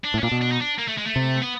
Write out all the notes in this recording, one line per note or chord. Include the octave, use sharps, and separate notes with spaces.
D4
A2
C#4
A#2 D4
B2
D4
D#4
D4
A#3
A3
G#3
A3
C3
B3